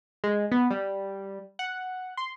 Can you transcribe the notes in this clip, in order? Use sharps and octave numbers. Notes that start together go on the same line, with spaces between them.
G#3
B3
G3
F#5
C6